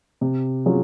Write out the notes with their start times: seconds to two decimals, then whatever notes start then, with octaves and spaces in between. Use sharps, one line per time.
0.21 C3
0.66 F#3 C#4 F4 G#4